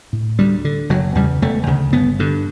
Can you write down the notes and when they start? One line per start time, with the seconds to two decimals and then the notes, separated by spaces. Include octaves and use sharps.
0.13 A2
0.39 D2 G3
0.65 D3
0.89 F#1 F#3
1.15 E2 C#3 G3
1.42 E1 A3
1.67 D2 C#3
1.93 G1 B3
2.19 G2 D3